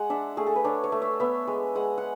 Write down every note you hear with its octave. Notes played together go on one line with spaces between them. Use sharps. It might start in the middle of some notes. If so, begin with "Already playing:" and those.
Already playing: G#3 F#5
D4 E5
A3 G#4
A4
B4
D4 C#5
C#5
A3
E5
B3 E5
G#3
G#3 F#5
F#5